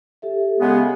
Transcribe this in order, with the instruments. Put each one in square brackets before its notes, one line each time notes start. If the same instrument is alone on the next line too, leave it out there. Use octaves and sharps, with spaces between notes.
[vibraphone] G4 A4 E5
[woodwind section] C#3 G#3 B3